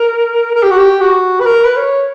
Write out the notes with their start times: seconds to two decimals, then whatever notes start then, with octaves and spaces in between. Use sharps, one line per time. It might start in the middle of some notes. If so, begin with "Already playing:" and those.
Already playing: A#4
0.55 A#4
0.63 G4
0.71 F#4
0.78 G4
1.00 F#4
1.40 B4
1.46 A#4
1.65 B4
1.76 C#5